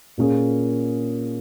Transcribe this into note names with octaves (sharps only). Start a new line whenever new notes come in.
A#2 A#3 C#4 G#4